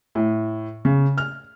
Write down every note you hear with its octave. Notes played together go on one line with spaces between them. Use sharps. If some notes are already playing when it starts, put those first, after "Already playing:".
A2
C#3
F6